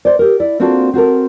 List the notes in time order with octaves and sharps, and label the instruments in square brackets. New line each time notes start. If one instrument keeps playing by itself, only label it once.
[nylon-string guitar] C5 D5
G4 A#4
E4 D5
A#3 C4 D4 F4 F#4 A4
C4 F#4 A4 A#4